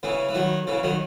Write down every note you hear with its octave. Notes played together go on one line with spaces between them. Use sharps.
C#3 E3
E3
D#3 F#3
C#3 E3
D#3 F#3